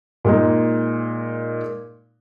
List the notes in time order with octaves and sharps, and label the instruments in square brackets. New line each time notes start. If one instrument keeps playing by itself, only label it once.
[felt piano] A#2 G#3 D#4